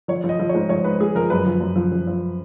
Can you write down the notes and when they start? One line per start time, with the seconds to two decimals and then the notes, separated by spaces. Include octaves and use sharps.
0.08 F3 C#5
0.24 F3
0.29 D#5
0.39 F3
0.49 C#5
0.55 G#2
0.69 F3 C#5
0.84 G#2 B4
1.00 G#2 G#4
1.15 F3 A#4
1.30 F#2 B4
1.46 F3
1.60 F#2
1.76 F3
1.92 F3
2.07 F3